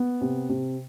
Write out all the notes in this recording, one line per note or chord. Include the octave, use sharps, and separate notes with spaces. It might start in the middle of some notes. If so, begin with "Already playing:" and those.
Already playing: B3
C3
C3